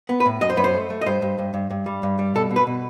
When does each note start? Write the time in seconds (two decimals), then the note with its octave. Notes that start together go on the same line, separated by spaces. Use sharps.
0.09 B3
0.20 B4
0.26 A2
0.41 F#2 D#5
0.50 C5
0.57 F#2 B4
0.64 C5
0.74 A3
0.90 A3
1.01 D#5
1.06 G2 C5
1.22 G2
1.38 G2
1.54 G2
1.70 G2
1.86 G3
2.03 G2
2.19 G3
2.35 B2 A4
2.51 B2
2.56 B4
2.67 B2